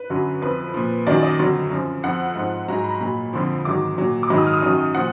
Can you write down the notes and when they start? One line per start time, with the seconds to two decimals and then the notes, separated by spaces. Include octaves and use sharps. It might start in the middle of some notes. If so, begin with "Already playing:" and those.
Already playing: B4
0.10 F#2 D3 F#3
0.42 F2 F3 B4
0.74 A#2 F3
1.07 F#2 D#3 F#3 D5
1.23 D#5
1.39 F2 D3 F#3
1.71 F#2 F3
2.03 F2 F3 F#5
2.36 G#2 F3
2.68 G#2 F#3 A#5
2.84 B5
3.00 A#2 F#3
3.33 F2 D3 F3
3.65 G#2 D#3 F#3 D6
3.98 A#2 F#3
4.23 D6
4.30 G#2 D#3 F#3 B5
4.38 D#6
4.46 F6
4.54 D#6
4.62 F#2 D#3 F#3
4.94 A#2 F3 F#5